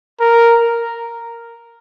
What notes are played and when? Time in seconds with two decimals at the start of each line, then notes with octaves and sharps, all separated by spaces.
0.21 A#4